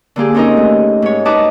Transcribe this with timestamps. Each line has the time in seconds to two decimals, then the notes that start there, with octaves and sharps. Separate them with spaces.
0.16 D3 A#3 G4 G#4
0.34 C4 C#4 D#4 A#4 D#5
0.57 A3
1.02 G#2 C#5
1.25 D#4 F#4 B4 D#5 A5 D6